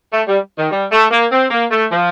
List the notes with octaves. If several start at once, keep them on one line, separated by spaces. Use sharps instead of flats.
A3
G3
D#3
G3
A3
A#3
C4
A#3
A3
F3